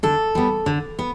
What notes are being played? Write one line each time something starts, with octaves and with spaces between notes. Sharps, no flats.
D3 A4
G3 B3
D3
B3